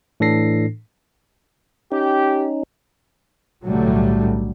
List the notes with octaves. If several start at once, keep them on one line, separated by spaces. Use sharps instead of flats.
A2 E3 D4 A4 A#6 C7
C#4 D#4 G4
B1 A2 D3 F#3 G3 A3